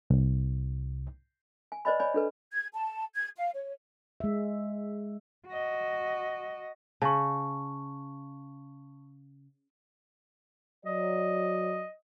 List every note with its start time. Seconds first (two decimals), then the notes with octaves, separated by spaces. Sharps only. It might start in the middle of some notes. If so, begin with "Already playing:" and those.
0.10 C2
1.72 G#5
1.85 B4 C5 D5 D#5 G#5 B5
2.00 C#5 D5 G#5 B5
2.14 D4 A4 B4
2.53 G#6
2.74 A5
3.15 G#6
3.37 F5
3.55 C#5
4.20 G#3 E5
5.47 F#4 D#5
7.02 C#3 A5 C#6
10.86 F#3 D5 D#5